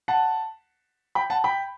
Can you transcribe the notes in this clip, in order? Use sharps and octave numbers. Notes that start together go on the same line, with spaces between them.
F#5 A5
G5 B5
F#5 A5
G5 B5